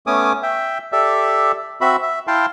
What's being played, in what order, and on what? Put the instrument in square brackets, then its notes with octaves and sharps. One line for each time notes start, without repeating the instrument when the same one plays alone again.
[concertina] A3 B3 C#4 G#5 D6 D#6
E5 G5
G4 A4 D5 E5
C4 F#4 E5 B5
E5
E4 F5 G5 A5 C6